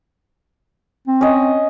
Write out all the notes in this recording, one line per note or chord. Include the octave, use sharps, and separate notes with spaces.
C4
C#4 D#5